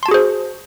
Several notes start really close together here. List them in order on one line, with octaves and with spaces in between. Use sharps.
C6 A5 F#4 G#4 C5